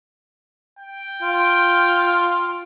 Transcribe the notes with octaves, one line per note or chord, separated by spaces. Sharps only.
G5
F4